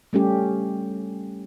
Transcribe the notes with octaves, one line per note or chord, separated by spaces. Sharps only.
G3 A3 C#4 G4